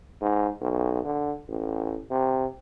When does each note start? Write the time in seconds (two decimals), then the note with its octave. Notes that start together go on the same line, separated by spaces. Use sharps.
0.21 G#2
0.61 B1
1.05 D3
1.49 A1
2.11 C3